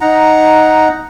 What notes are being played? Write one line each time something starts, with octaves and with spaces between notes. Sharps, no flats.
D#4 F#5 A#5